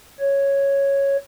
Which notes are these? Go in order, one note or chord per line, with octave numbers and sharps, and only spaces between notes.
C#5